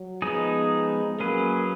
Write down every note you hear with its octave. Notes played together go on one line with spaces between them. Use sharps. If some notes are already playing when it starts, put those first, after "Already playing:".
Already playing: F#3
F3 G#3 B3 D#4 G#4
F#3 A#3 C#4 G#4 B4